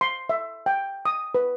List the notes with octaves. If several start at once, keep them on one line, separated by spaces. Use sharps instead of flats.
C6
E5
G5
D#6
B4